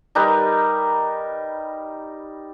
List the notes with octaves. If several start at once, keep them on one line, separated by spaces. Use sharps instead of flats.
G3 D#4 A#4 B4